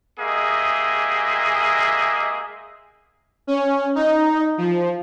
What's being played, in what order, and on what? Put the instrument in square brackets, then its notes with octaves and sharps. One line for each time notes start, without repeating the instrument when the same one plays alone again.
[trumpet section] G#3 A#3 G4 G#4 D#5 E5
[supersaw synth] C#4
D#4
F3